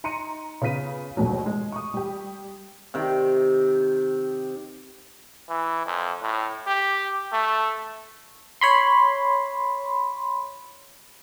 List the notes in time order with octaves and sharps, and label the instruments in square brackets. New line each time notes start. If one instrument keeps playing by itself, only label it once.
[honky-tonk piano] D#4 A#5 C6 C#7 D#7
C#3 B3 F4 F5 B6 D#7
A#1 D#2 G#2 B2 F#3
G#3
C#6 D#6
G3 G4
[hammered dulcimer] C3 D#3 G5
[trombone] E3
F2
A2
G4
A3
[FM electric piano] C#5 B5 C6